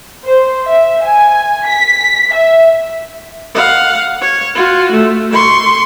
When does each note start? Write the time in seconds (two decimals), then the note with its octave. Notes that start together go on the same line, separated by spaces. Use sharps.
0.24 C5
0.65 E5
1.05 G#5
1.66 B6
2.34 E5
3.55 F5 F#5
4.21 C#5
4.55 F4 F#4
4.91 A3
5.33 C6 C#6